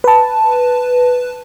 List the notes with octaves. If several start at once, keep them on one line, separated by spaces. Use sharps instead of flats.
B4 A5